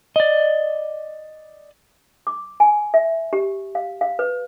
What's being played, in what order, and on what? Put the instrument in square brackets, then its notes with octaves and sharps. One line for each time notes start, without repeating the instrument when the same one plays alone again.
[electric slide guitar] D5 D#5
[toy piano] D6
G#5
E5
G4
F5
F5
B4